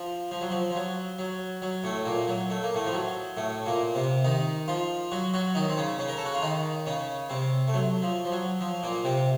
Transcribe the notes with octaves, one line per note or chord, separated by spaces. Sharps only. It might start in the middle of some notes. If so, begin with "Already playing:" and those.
Already playing: F3
F3
F#3
F3
F3
F#3
F#3
F#3
A2 A3
A#2 A#3
F#3
A3
A#3
A2 A3
F3
F#3
A2 A3
A#2 A#3
C3 C4
D#3 D#4
F3 F4
F#3 F#4
F#3 F#4
D#3 D#4
C4
C#3 C#4
C#3 C#4
A#4
A4
F#4
F4
D#3 D#4
C#3 C#4
C3 C4
A3
F#3
F3
F3
F#3
F3
A#2 A#3
C3 C4